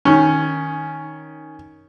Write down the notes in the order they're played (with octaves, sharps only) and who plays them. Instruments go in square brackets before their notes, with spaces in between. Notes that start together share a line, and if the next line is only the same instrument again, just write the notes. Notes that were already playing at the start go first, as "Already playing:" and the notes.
[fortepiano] D#3 C#4